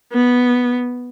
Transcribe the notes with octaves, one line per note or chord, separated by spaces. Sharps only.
B3